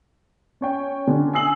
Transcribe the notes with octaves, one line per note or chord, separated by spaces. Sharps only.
C#4 C#5 G5
D3 C#4 D4
G#5 D#6 E6 C7 F#7